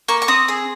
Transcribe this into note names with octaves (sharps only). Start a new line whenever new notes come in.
A#3 C#6
C#6
C4 D#6
G#4